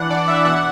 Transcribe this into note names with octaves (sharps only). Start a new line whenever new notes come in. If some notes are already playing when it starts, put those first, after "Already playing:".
Already playing: E3 D4 F#5
D4 D5
E3 E5
B2 F#5